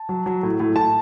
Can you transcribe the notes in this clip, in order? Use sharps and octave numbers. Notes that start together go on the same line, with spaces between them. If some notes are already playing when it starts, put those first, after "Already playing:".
Already playing: A5
F#3
F#3
A2
A2
A2 A5